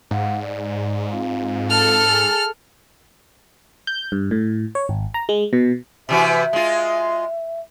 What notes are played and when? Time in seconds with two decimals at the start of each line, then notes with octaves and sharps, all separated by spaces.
0.11 G#2 F5 F#5
0.42 D5
1.11 C4 F4 F5
1.70 A4 F6
2.09 G#4 G#5
3.87 G6
4.12 G2
4.31 A2
4.75 C#5
4.89 G#1
5.14 A#5
5.29 G#3
5.53 B2
6.09 C3 E3 F#4 E5
6.53 G#3 F4